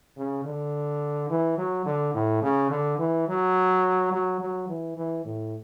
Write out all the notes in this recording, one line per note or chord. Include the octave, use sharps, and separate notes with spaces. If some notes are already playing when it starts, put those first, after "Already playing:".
C#3
D3
E3
F#3
D3
A2
C#3
D3
E3
F#3
F#3
F#3
E3
E3
A2